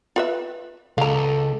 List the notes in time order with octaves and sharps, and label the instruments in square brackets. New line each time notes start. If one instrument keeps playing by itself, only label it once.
[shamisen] F4 B4 E5
[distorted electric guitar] C#2 [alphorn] A4 [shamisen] F5 A#5